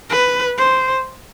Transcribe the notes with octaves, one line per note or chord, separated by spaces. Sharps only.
B4
C5